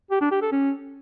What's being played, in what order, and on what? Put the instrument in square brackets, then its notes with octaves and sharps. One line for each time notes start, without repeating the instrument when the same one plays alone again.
[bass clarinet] G4
D4
G4
A4
C#4